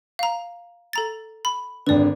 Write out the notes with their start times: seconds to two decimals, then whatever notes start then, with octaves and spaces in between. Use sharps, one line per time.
0.19 F5 A#5
0.93 A4 A#5 A6
1.45 B5
1.87 G#1 D3 B4 D5